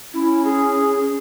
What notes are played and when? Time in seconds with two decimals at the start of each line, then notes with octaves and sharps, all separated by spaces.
0.14 C#4 E4
0.45 G#4